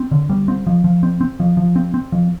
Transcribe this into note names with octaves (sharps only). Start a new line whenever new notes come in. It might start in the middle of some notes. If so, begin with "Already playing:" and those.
Already playing: C4
D3
G3
C4
F3
F3
C4
C4
F3
F3
C4
C4
F3